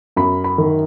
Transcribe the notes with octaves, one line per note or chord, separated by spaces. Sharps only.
F#2 B5
B5
D#3